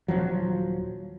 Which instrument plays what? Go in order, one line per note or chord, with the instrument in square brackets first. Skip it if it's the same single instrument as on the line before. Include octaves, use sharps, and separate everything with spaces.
[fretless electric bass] D#1 B1 F3 F#3